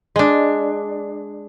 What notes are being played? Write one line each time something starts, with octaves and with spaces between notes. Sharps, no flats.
G#3 D4